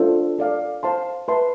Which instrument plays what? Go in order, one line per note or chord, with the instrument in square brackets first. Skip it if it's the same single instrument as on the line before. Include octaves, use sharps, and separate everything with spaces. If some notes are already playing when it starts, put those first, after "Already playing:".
Already playing: [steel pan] D4 F4 A4 C5
A4 D5 F5
C5 F5 A5 C6
B4 E5 A5 C6